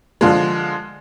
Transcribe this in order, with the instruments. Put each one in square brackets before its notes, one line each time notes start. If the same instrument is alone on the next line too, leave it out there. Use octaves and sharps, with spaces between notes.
[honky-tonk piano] D3 F3 G#3